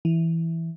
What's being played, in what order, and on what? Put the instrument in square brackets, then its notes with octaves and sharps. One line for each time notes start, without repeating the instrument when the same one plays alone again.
[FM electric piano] E3